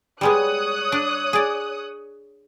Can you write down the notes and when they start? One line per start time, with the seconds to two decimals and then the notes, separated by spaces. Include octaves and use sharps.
0.21 G3 G#3 B3 C#5 D#6 F#6
0.92 D4
1.33 G#4 D5